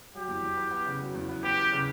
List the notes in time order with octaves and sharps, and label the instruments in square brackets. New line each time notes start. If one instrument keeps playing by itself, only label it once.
[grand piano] F#3 [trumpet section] G4
[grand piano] E2
E2
B3
B3
C#3
F#3
E2
B3
[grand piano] B3 [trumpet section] G4
[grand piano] B3
C#3